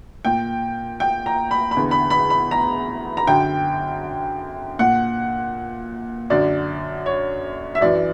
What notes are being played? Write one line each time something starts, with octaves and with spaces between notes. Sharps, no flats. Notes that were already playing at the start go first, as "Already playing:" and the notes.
A#2 G5
G5
A#5
B5
B5
E2 D3
B5
B5
B5
A#5
A#5
F#2 D3 G5
A#2 F#5
F#2 D3 D5
C#5
E5
F#2 E3 D5